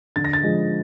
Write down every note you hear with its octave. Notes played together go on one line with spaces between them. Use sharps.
D3 A6
A#6
A6
F3 G#3